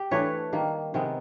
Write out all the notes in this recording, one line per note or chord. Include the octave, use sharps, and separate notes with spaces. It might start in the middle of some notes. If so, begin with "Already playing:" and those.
Already playing: G4
E3 A3 D4 B4 C#5
D#3 G3 A#3
C3 D#3 G#3 B3